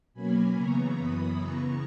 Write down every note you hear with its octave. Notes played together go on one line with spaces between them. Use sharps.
B2 F#3 A#3 C#4 G#5 B5
C#3 E3 B3 A#5 C#6
F#2 E3 B3 B5 D#6
C#3 E3 B3 A#5 C#6